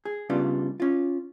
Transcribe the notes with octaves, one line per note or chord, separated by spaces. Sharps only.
G#4
C#3 G3 B3 D4 F4
C#4 F4